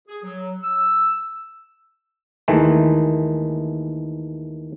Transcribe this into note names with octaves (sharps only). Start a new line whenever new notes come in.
G#4
F#3
E6
D#2 D#3 E3 G#3 A3